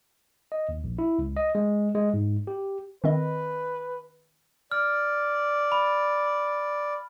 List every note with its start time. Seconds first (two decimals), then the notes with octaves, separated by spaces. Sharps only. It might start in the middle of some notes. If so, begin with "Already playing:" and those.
0.52 D#5
0.69 D#2
0.84 A#1
0.99 E4
1.19 C#2
1.37 D#5
1.55 G#3
1.95 G#3
2.14 G#2
2.47 G4
3.04 D#3 C4 B4 D#5
4.72 D5 F6
5.72 B5